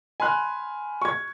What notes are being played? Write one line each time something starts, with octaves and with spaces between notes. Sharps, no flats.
G#5 B5 C6 F6 F#6
C#6 G#6